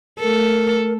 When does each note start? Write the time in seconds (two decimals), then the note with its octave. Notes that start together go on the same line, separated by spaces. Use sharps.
0.19 A3 A4 A#4